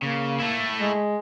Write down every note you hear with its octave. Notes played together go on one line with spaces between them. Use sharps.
C#3 A#3
A3 E4
G#3